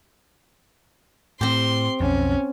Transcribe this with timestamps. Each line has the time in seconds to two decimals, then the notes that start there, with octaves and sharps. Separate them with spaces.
1.41 A2 C4 G4 C6
2.00 B1 F2 C#4